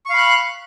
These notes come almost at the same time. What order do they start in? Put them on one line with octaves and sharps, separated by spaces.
C#6 F5 B5 F#6